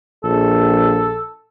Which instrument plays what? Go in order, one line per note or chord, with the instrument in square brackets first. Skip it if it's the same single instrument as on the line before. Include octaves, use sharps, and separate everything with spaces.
[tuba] A#1 [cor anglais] A4